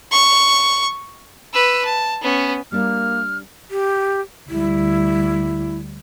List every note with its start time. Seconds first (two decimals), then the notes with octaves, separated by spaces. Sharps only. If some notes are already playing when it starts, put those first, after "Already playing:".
0.12 C#6
1.53 B4 E6
1.85 A5
2.22 B3 C#4
2.72 G3 A#3 D4 F6
3.71 G4
4.49 D2 G3 E4